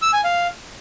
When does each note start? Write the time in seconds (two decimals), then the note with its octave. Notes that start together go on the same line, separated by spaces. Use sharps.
0.02 E6
0.13 G#5
0.24 F5